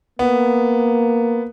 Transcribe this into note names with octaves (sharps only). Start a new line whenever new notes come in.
A#3 B3